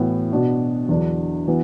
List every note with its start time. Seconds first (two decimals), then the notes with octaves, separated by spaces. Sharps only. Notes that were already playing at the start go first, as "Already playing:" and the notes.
Already playing: A2 E3 B3 F#4
0.31 B2 B3 D4 F#4
0.89 E2 D3 F#3 D4
1.47 E3 B3 F#4